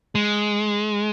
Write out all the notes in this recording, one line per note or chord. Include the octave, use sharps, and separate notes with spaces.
G#3